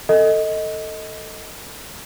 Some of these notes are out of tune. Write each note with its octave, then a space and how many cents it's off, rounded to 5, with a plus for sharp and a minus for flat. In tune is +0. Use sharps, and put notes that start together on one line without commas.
A4 +20 D#5 +15